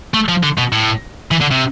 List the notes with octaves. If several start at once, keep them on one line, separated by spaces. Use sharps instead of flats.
A3
F3
D3
B2
A2
E3
D3
C3